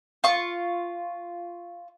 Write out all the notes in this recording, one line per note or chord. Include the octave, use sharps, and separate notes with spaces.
F4 C#6